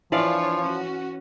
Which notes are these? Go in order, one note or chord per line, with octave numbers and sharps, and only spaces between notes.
E3 F3 D4 F4 C#5 D5 F5
C#4 F#4